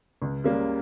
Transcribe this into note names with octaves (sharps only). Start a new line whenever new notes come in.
C#2
C#3 G3 A#3